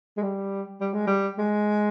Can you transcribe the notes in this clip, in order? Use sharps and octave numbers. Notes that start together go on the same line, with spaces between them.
G#3
G3
G3
G#3
G3
G#3